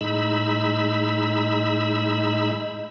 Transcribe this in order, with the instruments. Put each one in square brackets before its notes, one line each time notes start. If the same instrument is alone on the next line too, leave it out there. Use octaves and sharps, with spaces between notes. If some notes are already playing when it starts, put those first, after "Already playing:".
[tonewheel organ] A2 G#3 D#4 B5 E6